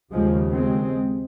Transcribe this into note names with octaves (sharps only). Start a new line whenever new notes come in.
D#2 C#3 F3 G#3
G#3 C4